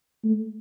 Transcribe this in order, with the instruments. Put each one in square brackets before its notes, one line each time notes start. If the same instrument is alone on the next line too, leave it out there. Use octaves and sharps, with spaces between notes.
[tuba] A3